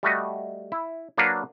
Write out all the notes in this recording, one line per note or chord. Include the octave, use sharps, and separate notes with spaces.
G3 A3 F#4 D#5
E4
F#3 A#3 D4 B4 F5 F#5